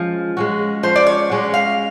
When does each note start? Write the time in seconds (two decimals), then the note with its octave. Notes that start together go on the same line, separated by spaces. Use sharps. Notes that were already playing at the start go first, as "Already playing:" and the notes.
Already playing: F3 G#3 C#4
0.37 G#3 C#4 F#4
0.83 F3 C5
0.96 D5
1.07 C#5
1.30 G#3 C#4 F#4
1.54 F5